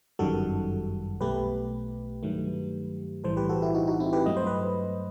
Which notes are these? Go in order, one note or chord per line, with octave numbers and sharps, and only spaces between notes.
G1 F#2 D#3 G3 F#4 A4
B1 B2 A3 G4 B4
G2 D#3 F#3 A3
B1 A2 E3 G3 A4 C5
G4 B4
F#4 A4
E4 G4
D#4 F#4
D#4 F#4
C4 E4
G4 B4
G2 F#3 A3 D#5
C5
B4 D#5